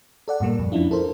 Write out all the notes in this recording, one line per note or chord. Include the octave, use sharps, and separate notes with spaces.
A4 D5 F#5
G2 A#2 G3 A#3
F2
F3 C#4 D4 E4 F4
A4 A#4 C5